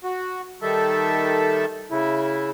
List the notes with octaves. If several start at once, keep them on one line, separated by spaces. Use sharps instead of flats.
F#4
D#3 G3 A4 E5
C#3 E4